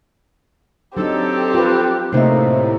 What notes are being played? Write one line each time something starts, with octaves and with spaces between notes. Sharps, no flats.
F#3 C4 D4 D#4 G4 A4
F4 B4
A2 C3 A#3 D#4 C5 E5